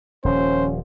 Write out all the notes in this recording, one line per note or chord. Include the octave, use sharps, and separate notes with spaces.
D#1 F3 C#4 C5